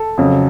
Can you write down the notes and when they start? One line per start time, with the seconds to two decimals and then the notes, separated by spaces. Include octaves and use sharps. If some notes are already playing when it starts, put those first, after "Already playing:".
Already playing: A4
0.18 F2 C#3 F#3